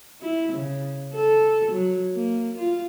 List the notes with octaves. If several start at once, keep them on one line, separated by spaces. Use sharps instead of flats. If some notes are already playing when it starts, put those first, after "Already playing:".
E4
C#3
A4
F#3
A#3
F4